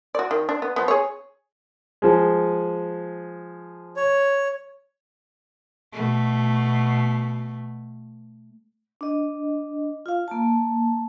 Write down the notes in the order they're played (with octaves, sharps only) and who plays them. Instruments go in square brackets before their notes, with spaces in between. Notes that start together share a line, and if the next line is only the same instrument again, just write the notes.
[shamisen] F#4 D5
D#3
D4
B3
F3 B3
G#4 C#5
[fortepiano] F3 G#3
[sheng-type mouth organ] C#5
[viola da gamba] B2 A3
[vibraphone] D4 D#5
F4 F5
A#3 A5